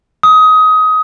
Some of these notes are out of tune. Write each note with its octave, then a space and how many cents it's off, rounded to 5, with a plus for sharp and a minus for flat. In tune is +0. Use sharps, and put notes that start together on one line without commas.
D#6 +20